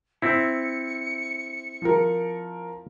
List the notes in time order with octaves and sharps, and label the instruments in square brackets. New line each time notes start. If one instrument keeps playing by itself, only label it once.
[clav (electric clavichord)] C4 E4 [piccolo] C#7
[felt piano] F3 A#4